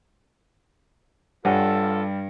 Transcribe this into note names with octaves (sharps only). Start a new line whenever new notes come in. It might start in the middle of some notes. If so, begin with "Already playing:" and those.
G2 G3 F4 A4 C#5 F#5 G#5